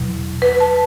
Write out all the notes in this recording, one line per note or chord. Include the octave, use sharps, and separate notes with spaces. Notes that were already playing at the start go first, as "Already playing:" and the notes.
Already playing: E2 B2 F#3
B4
A5